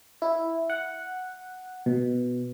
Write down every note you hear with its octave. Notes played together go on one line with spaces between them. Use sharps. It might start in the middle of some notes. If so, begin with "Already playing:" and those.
E4
F#5
B2